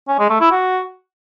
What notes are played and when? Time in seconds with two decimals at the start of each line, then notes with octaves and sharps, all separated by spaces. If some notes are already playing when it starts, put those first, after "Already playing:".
0.08 C#4
0.19 G#3
0.30 A3
0.40 E4
0.51 F#4